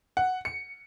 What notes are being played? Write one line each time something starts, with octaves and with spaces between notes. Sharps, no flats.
F#5
C#7